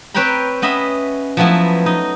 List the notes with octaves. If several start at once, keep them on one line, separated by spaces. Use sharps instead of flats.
C4 B4 C#5 G5 A#5 B5
B3 C#4 D#5 E5 B5
F3 F#3 A3 B3 E4
D#4 D#5